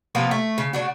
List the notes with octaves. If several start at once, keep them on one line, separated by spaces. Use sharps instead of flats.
C3 F3 A#3 B3
A3
C#3
C#3 D4 F#4